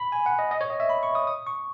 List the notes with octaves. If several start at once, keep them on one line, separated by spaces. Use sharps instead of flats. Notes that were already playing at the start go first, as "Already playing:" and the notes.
Already playing: B5
G#5
F#5
D#5
D#5
C#5
D#5
E5
B5
C#6
D#6
D#6
C#6